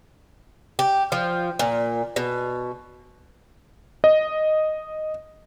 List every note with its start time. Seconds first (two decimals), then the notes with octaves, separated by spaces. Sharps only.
0.79 G4
1.12 F3
1.59 A#2
2.16 B2
4.04 D#5